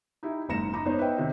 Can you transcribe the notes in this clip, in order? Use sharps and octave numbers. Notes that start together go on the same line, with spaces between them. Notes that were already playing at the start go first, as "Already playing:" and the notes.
D#4 E4 G4
F#1 G#2 A#5 A#6 C#7 E7
D#4 A#5 B5 D6
B3 D#4 C5 C#5
B4 D#5 E5 G5
C3 D#3 C4